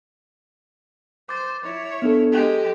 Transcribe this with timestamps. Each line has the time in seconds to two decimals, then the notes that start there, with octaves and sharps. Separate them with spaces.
1.29 C5 D6 A6
1.64 E4 C#5
2.02 B3 D4 A4
2.32 G#3 G4 A4